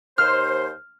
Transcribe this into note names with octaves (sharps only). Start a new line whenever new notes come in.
D#2 C5 F6